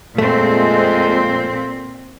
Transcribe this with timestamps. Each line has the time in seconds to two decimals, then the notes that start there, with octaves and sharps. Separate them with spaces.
0.18 F2 A#2 G#3 A3 C4